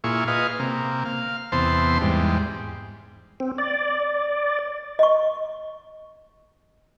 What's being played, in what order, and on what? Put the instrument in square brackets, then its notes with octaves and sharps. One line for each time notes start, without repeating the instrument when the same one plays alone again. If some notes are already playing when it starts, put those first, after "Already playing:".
[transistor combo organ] A#2 E4 F4 G#4 C#6
F4 G#4 B4 D#5 F5
C3 A#3
F5
E2 C3 B3 C5 A5 C6
E2 G#2 G3
[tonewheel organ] C4
D5
[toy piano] D#5 C#6